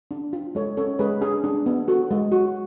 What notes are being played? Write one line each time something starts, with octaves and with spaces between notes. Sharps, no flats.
D4
F4
G#3 A4 C#5
C#4 A4 C#5
G#3 G#4 B4
D4 G#4
D4
B3
F#4 A4
G#3
F#4